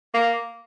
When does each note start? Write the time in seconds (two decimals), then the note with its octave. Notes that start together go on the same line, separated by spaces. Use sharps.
0.14 A#3